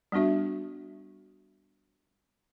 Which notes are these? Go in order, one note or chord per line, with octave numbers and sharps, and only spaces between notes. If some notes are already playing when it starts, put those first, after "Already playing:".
G3 B3 D4 F#4 E5